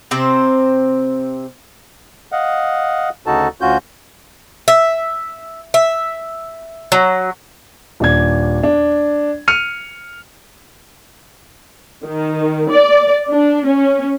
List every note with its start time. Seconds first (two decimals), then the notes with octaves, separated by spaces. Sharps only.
0.11 C3 C4 C5
2.32 D#5 F5 F#5
3.26 D2 C#3 D#4 F#4 A4 A5
3.61 D2 C#4 F4 F#4 G6
4.68 E5
5.74 E5
6.92 F#3
8.00 D#1 D4 G#6
8.63 D4
9.48 F6 C#7 D#7
12.06 D#3
12.70 D5
13.31 D4
13.66 C#4